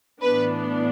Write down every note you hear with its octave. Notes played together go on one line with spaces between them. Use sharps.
A2 E3 B3 D4 B4